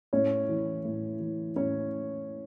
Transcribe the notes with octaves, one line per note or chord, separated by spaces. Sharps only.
A2 C#4 C#5
E3
A2
E3
A2 C#4 C#5